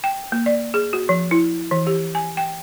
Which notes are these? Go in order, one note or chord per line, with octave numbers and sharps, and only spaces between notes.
G5
A#3
D5
G#4
F#4
F3
E4
E3
G4
G#5
G5